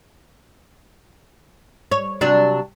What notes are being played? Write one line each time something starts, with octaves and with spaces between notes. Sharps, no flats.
C#5
C3 F#3 D4